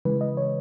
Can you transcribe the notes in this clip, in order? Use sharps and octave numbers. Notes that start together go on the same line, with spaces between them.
C#3 E3 G#3 B4
D#5
C#5